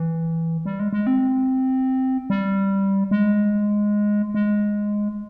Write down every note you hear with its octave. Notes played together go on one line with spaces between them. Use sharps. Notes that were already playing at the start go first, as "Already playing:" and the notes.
Already playing: E3
G3
G#3
G#3
C4
G3
G#3
G#3